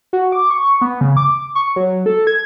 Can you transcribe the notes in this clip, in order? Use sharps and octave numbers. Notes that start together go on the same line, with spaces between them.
F#4
D6
C#6
B3
C#3
D6
C#6
F#3
A4
G#6